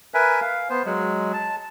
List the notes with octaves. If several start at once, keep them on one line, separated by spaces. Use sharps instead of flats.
A#4 B4 E5 G#5
F5
B3 C5
F#3 G#3
A5